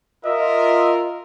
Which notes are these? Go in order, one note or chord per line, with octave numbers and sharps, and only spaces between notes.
F4 A#4 D#5 E5